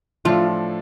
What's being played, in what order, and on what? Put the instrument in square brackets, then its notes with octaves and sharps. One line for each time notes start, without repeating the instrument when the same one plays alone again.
[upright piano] A2 F3 A3 D4 [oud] F4